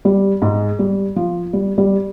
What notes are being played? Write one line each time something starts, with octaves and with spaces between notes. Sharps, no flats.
G3
G#2 G#3
G3
F3
G3
G3